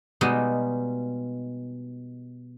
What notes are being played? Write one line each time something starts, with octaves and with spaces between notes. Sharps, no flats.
B2 G3 G#3 D#4